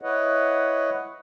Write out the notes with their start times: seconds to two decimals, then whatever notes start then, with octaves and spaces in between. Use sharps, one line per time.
0.02 E4 B4 C#5 D#5 F#5